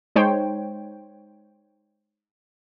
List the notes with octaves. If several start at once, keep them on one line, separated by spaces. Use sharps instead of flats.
G#3 D#4 C5 C#5 G5